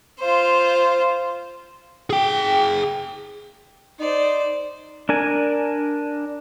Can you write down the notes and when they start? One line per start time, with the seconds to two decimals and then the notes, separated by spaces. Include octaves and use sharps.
0.20 F4 C5
2.10 G#4 G5
4.00 D#4 C5 D5
5.09 D4 A#4 G#5